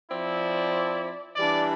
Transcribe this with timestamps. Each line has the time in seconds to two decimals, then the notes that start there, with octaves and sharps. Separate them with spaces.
0.11 F3 C4 E4 D5
1.36 E3 G3 D4 D5